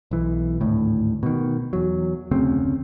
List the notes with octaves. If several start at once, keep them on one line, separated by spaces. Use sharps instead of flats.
B1 E3
G#1 D2 A2
B2 D#3
E2 F#3
F1 D2 C#3 C4